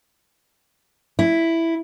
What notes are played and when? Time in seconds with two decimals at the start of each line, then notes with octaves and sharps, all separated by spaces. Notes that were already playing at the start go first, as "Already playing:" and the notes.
1.19 E4